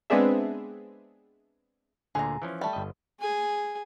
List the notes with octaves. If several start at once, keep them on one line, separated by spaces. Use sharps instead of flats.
G#3 B3 C4 D4 G#4 E5
D2 A#2 D3 G#4 A#5
E3 F3 C#4
G3 A3
G1 D#5
G#4 G#5